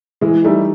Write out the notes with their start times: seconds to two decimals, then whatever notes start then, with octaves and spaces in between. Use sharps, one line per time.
0.21 E3 G#3
0.44 G3 A3 D#4